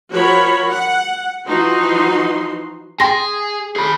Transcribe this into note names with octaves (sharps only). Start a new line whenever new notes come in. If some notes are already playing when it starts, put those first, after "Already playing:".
F3 F#4 A#4 C#5 B5
F#5
E3 F3 D#4 F#4 C6
G#4 G5 C6 A#6
G#4 B5